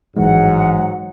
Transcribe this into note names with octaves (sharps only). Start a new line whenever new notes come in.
A1 G#2 E3 F#3 G#3 F#5